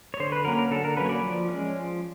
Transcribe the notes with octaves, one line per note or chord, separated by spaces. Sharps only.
C#5
D3 C5
B4
F#3 A#3 C#4 A#4
A#4
D3 A4
A#4
F#3 A#3 C#4 B4
C#5
D5
F3
G#3 C#4
F3